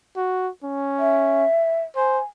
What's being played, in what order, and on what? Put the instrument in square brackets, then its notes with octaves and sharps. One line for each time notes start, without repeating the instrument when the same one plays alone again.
[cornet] F#4
C#4
[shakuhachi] E5
[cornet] C5 [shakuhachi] G#5